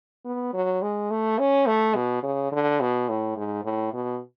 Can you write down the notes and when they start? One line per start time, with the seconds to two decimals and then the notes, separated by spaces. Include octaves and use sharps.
0.25 B3
0.54 F#3
0.82 G#3
1.11 A3
1.39 C#4
1.67 A3
1.95 B2
2.23 C#3
2.52 D3
2.81 B2
3.09 A2
3.37 G#2
3.64 A2
3.94 B2